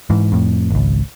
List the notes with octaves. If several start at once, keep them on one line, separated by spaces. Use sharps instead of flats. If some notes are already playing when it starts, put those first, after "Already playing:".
G#2 E3
F2 A2
G#1 C#2